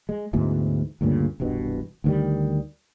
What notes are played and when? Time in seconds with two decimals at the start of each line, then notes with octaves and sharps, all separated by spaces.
0.09 G#3
0.33 D2 G#2 B2 E3
1.01 D2 G2 A#2 C#3
1.40 E1 C2 G2 B2
2.04 D2 D#3 G3